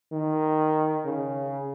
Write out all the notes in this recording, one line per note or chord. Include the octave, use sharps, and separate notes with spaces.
D#3
C#3